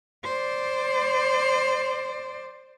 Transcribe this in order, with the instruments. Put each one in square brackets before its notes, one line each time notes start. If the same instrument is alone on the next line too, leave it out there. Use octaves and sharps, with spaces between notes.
[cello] C5 D5